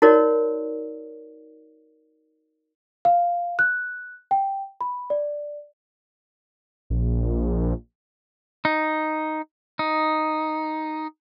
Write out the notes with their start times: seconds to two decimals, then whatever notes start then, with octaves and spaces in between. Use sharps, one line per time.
0.02 D#4 F#4 A#4 C#5 D5
3.05 F5
3.59 F#6
4.31 G5
4.81 B5
5.10 D5
6.90 A#1
8.65 D#4
9.79 D#4